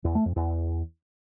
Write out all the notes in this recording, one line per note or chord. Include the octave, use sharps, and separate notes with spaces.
E2
A3
F2
E2